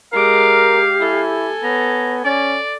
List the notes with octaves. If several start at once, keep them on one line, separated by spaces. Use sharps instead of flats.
G#3 G4 A#4 F5 D6
E4 A4 G#5
B3 C#5 A#5
C#4 D5